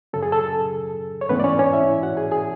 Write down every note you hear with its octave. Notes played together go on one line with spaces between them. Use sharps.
F#2 C#3 F#3 C#4 A4
G#4
A4
C#5
G#2 E3 A3 B3 C#4 B4
D5
C#4 C#5
C#4 C#5
E4 E5
F#4 F#5
G#4 G#5
G#4 G#5